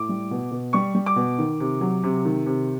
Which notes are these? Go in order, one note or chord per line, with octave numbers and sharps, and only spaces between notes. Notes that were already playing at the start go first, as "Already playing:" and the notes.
Already playing: A2 D6
G3
B2
B2
G3 C#6
G3
D6
B2
D#3
C3
F#3
C3
D#3
C3